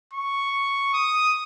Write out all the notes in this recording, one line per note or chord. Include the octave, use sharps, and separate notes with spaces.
C#6
D#6